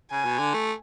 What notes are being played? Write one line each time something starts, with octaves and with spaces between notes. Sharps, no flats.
C#3 G#5
B2
D3
A3